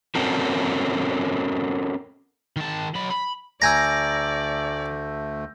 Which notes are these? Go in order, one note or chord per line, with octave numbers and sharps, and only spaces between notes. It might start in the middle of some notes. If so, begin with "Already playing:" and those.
C4 C#4 F#4 A4 A#4
D#3 A5
F#3 B5
B5
D2 A3 D5 G#5 A#5 E6 G6 A#6